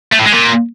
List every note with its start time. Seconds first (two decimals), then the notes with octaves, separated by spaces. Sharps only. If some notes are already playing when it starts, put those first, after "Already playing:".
0.13 A3
0.19 A2
0.26 G#3
0.33 A#2